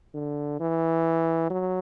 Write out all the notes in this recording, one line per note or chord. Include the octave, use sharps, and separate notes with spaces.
D3
E3
F#3